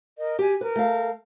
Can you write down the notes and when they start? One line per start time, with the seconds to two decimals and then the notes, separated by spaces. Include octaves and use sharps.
0.17 A#4 D#5
0.39 G4 G#5
0.61 A#4 B4
0.76 A3 F5